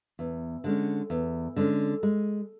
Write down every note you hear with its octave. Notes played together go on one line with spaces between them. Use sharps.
E2
D3 G#3 C#4
E2
D3 G#3 C#4
G#3